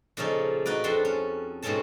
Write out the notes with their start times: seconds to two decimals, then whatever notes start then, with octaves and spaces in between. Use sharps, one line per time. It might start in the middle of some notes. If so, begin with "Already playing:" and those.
0.17 A#2 C#3 F3 C#4 D#4 A4
0.66 D#4 F#4 B4 D5
0.84 F2 C4 D4 A4 C6
1.05 C#4
1.62 G#2 B2 C4 C#4 A4 A5